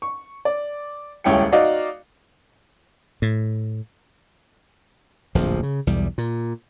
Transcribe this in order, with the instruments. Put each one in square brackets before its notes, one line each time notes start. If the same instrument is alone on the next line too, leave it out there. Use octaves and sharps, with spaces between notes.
[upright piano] C#6
D5
D#1 C#2 C#4 E4 G5 C#7
D#4 F#4 D5 D#5 F5
[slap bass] A2
D1 A#1 F2 F3
C#3
B1 E2 G3
A#2